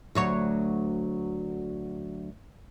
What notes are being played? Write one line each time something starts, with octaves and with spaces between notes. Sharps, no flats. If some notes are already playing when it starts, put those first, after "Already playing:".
D2 F#3 C#5